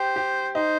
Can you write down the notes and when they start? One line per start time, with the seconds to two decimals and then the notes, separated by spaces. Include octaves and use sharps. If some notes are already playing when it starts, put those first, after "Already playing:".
Already playing: G4 C5
0.16 G4
0.55 D#4 C5